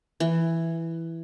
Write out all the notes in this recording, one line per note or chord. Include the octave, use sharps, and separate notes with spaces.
E3